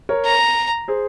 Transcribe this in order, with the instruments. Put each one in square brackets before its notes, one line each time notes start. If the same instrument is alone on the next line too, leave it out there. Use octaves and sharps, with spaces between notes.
[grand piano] A#4 C#5
[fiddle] A#5
[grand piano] G#4 C5